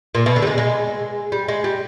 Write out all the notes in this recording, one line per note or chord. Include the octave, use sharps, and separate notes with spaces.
A#2
B2
D3
G3
G#3
G#3
G3
G#3
G3